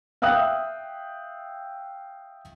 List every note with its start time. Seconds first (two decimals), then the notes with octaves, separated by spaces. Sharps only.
0.22 E5 F5 G5 D#6 F#6